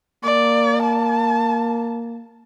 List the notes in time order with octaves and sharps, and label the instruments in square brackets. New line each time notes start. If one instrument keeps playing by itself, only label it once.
[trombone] A#3 [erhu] D5
[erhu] A5